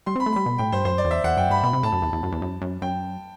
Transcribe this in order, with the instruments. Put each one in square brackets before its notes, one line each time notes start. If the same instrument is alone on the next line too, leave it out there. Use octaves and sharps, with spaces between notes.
[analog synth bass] G3 [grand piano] C6
[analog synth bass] C4
[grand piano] B5
[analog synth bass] A3
[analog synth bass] G3 [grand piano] B5
[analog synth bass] B2
[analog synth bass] A2 [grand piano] G5
[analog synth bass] G2 [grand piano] C5
[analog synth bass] F#2 [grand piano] C5
[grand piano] D5
[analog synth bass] E2
[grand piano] E5
[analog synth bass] E2 [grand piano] F#5
[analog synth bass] F#2 [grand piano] G5
[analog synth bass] G2 [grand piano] B5
[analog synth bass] B2 [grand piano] B5
[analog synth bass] C3
[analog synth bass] A2 [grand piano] A5
[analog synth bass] F#2
E2
E2
F#2
E2
F#2
F#2
[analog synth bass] F#2 [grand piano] G5